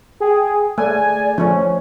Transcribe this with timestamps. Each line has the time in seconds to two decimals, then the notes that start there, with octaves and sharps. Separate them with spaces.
0.20 G#4 G5 G#5
0.78 A3 G#4 D5 G#5
1.38 F3 A3 C#4